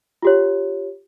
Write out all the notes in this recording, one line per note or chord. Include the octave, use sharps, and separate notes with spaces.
F4 G4 C#5